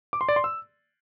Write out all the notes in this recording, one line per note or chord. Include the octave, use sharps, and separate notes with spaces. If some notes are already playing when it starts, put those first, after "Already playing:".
D6
C6
D5
C6
E6